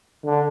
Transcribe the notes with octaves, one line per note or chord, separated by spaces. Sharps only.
D3